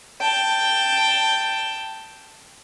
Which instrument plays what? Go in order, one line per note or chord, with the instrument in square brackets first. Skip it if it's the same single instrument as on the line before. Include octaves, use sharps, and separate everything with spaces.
[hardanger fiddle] G5 A5